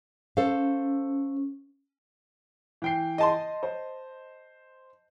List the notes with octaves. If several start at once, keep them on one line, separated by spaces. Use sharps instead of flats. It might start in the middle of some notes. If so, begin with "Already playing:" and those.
C#4 A4 C5 F5
E3 G5 C7
D#5 A5 C6
C5